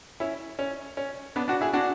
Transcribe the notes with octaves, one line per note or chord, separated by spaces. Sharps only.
C#4 E4
C#4
C#4
B3 D4
D4 F#4
E4 G#4
D4 F#4